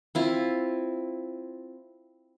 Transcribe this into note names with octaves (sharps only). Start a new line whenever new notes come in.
C4 E4 F4